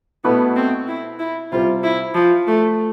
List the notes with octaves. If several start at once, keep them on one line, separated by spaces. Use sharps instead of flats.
B2 A3 B3 E4 B4
C4
E4
E4
C3 G3 C4 F4
E4
F3
A3